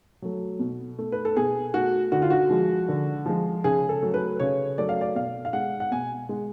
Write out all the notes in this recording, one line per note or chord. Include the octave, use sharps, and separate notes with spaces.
F#3 A3
B2
A3
B4
A4
B2 G#4
A3 F#4
D3 F#4
F4
F#4
F3 G#3
D3
F3 G#3
C#3 G#4
A4
F#3 A3
B4
C#3 C#5
F#3 A3 D5
F5
D5
B2 F5
F5
G#3 F#5
F#5
B2 G#5
G#3